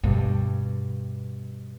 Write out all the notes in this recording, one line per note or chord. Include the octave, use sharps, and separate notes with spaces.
G2 B2